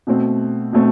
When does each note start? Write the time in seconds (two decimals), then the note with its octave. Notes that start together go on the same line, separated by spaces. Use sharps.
0.07 B2 A3 C4
0.73 B2 A3 C4